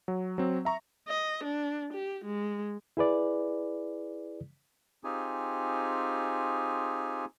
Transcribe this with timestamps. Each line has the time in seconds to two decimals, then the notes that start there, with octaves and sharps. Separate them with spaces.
0.08 F#3
0.38 F#3 C4
0.65 E5 A#5 C#6
1.08 D#5
1.44 D4
1.94 G4
2.25 G#3
2.97 E4 G#4 B4 D5
5.04 C4 D#4 F4 G4 G#4 G#5